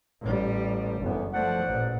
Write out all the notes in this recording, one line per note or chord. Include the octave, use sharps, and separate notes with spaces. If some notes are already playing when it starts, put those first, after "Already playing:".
A1 G3
F#1 D2 E3 B3
F3 A3 C5 D5 F#5
A1 A#2